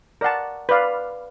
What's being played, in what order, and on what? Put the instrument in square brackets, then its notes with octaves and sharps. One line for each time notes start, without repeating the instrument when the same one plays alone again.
[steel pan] A#4 D5 F#5 A5
B4 D5 F5